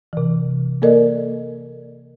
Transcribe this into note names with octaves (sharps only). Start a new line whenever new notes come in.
C3 E3
A#3 A4 A#4 D5 D#5